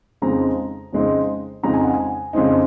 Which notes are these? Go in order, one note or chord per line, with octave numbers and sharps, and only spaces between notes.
F2 C#3 G#3 C4 D#4 A#5
F2 C#3 G#3 C4 D#4
F2 C#3 G#3 C4 D#4 A#5
G#5
F#5
G#5
F2 C#3 G#3 C4 D#4